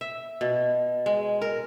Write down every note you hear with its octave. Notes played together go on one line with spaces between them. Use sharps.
E5
B2
G#3
A#4